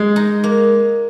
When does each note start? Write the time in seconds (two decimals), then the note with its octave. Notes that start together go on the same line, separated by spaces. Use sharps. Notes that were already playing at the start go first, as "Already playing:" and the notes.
Already playing: G#3
0.16 D#4
0.44 A#3